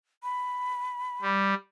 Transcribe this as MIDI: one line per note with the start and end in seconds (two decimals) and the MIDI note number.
0.23 1.28 83
1.22 1.54 55